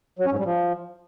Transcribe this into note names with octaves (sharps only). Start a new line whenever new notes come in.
F#3
C#4
G#2
G3
F3